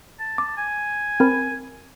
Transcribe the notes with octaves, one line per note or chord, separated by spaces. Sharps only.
A5
D6
G#5
C4 A#4 B5